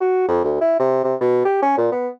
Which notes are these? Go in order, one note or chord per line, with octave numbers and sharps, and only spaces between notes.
F#4
F2
D2
E4
C3
C3
B2
G4
C#4
A#2
B3